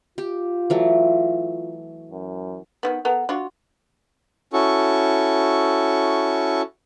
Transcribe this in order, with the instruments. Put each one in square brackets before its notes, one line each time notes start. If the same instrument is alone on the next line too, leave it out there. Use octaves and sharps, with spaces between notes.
[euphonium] F4 [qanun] G4
[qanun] E3 F#3 A3
[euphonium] F#2
[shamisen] D#3 E3 B3
B3 A4 A#4
D4 F4 F#4
[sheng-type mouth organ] C#4 E4 F#4 A4 C#6